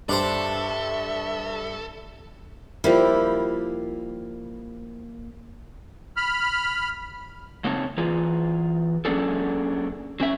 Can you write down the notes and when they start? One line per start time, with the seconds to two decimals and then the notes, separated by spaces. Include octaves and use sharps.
0.09 G2 D4 G4 A4 C5 E5
2.84 F3 G3 A#3 E4
6.16 B5 F6
7.64 C#3 A#3 C4 D#4 C#5 A5
7.97 E3 F4 G#4
9.05 F#3 A#3 C#4 D4 G#4 A4
10.20 F#3 C#4 E5